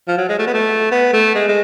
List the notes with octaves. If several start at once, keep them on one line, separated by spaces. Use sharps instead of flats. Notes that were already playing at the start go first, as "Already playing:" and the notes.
F3
F#3
G#3
A3
B3
A3
B3
A3
G#3
G#3